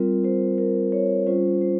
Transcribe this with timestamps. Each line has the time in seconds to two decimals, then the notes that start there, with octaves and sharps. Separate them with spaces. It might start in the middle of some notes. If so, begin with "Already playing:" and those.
Already playing: G3 C4 F4 A#4
0.24 C5
0.58 A#4
0.92 C#5
1.27 G3 C#4 F4 C5
1.61 C5